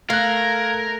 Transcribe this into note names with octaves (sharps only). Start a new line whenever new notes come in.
A3 A#4 F5 F#6 G#6